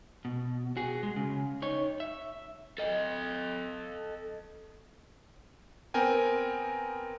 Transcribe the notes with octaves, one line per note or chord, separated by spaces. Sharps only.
B2
F#4 G#4
G#3
C#3
D#4 C#5
E5
A4 D#5
B3 C4 A#4 G5 G#5